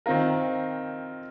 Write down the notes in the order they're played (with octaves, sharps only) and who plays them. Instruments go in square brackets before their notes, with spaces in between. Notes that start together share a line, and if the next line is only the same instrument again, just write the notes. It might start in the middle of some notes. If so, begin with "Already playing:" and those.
[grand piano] D#3 C4 F4 A#4